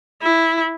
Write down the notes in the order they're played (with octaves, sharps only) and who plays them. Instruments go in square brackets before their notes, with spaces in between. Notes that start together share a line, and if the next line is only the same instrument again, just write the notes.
[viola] E4